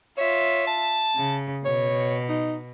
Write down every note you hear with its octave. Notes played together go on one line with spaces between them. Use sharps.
F4 C#5 E5
A5
C#3
B2 C#5
D#4